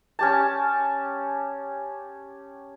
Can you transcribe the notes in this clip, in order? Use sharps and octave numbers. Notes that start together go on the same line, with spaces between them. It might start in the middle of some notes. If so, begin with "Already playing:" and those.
C#4 G4 A5